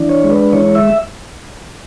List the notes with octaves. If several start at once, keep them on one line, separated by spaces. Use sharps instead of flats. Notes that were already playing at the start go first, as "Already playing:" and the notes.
Already playing: E3 D4
C#5
G#3
B4
E3 C#5
E5